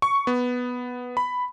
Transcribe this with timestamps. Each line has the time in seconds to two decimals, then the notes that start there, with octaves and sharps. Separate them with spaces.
0.02 C#6
0.27 B3
1.17 B5